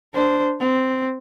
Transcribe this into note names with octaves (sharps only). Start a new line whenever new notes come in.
D4 C5
C4